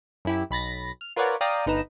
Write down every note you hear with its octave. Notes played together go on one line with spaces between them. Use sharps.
F#2 E4 G4
B1 B5 A6 A#6
F6
F4 A#4 B4 C#5 D5 F#5
D5 F5 G5 A#5 D#6
G1 D#4 B4 A#5 E7